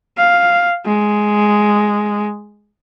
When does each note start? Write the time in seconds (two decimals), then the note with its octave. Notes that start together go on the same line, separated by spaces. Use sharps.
0.18 F5
0.85 G#3